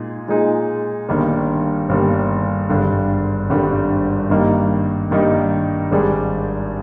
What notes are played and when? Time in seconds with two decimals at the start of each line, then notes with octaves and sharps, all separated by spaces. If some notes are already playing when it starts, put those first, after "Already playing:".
Already playing: A#2 G#3 D#4 G#4
0.28 A#2 G#3 D#4 G#4
1.09 G1 G2 D#3 G3 A#3
1.89 G1 G2 D#3 G3 A#3
2.69 G#1 G2 D3 G3
3.50 G#1 G2 D3 G3
4.30 G2 D#3 G3 A#3 D#4
5.11 G2 D#3 G3 A#3 D#4
5.91 G#1 G#2 G3 D4 G#4